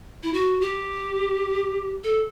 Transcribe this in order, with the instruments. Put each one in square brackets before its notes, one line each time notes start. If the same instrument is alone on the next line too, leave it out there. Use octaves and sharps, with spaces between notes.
[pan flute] E4
F#4
G4
A4